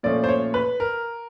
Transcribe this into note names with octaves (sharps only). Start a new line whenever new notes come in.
A#2 F3 A3 C#4 D5
C5
C#5
B4
A#4